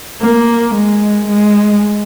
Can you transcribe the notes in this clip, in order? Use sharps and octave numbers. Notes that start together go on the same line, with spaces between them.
A#3
G#3
G#3